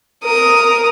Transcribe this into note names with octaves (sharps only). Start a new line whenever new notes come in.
A#4 D#6